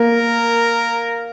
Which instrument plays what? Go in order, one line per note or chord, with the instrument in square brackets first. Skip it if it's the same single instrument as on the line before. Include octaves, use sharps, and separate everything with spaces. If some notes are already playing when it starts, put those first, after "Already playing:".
Already playing: [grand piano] A#3 [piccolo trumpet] A#4